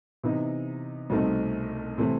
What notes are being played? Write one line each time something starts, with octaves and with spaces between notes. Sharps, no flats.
C3 E3 B3 D#4
C2 B2 A3 C4 D#4
C3 E3 A3 C4